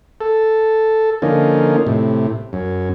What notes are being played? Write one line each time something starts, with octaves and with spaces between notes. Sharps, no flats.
A4
D3 F3 A#3 C#4 D#4
A2 C3
F#2